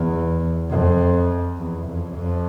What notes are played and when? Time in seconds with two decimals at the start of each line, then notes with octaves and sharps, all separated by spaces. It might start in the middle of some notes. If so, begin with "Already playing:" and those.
Already playing: E2
0.71 F2
1.58 E2
1.87 F2
2.16 F2